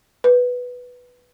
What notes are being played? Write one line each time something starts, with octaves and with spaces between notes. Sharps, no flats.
B4